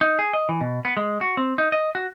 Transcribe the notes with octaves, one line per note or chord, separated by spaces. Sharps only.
D#4
G#4
D#5
E3
B2
B3
G#3
F#4
C4
D#4
D#5
F#4